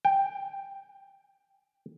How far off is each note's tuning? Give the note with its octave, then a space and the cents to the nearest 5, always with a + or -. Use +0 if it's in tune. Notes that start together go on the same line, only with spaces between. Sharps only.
G5 +10